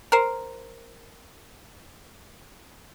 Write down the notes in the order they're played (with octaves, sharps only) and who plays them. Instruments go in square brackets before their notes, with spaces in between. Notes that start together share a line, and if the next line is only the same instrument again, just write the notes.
[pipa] A#4 C5